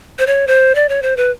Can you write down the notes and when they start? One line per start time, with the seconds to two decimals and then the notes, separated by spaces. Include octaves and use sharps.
0.19 C5
0.27 C#5
0.47 C5
0.75 D5
0.89 C#5
1.02 C5
1.17 B4